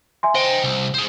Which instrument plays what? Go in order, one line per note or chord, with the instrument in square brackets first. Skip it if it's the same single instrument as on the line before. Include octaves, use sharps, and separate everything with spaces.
[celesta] E5 G#5 C6
[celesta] C5 [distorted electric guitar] D#5 G5
[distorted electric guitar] C2
G#4 C5